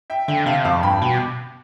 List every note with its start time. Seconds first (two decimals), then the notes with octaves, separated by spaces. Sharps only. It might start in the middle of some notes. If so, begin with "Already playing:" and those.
0.10 E5 G5
0.28 D3 E5 G5
0.46 C3 F5 A5
0.65 F2 F5 A5
0.83 G2 G5 B5
1.02 B2 G5 B5
1.13 D6